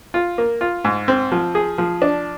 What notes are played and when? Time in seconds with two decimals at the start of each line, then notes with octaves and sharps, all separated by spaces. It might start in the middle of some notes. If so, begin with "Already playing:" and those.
0.14 F4
0.38 A#3
0.61 F4
0.85 G#2
1.08 C4
1.32 F3
1.55 G#4
1.78 F3
2.02 D4